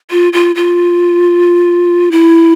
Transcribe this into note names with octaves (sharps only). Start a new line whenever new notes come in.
F4
F4
F4
E4